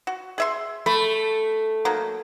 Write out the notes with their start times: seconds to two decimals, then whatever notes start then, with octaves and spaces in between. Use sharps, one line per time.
0.07 F#4
0.38 G#4 E5 C6
0.86 A3 B5
1.85 F#3 A#3 D#4